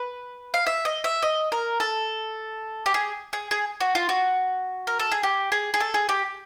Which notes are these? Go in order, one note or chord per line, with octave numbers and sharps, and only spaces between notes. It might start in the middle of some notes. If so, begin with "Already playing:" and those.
Already playing: B4
F5
E5
D#5
E5
D#5
A#4
A4
G4
G#4
G#4
G#4
F#4
F4
F#4
A#4
A4
G#4
G4
G#4
G#4
A4
G#4
G4